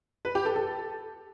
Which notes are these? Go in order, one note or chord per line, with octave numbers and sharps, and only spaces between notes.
B4
G4
A4
A4